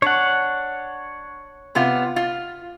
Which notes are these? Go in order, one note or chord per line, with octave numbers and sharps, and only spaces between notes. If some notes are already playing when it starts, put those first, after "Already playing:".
D4 C#5 F#5
C3 B3 F4
F4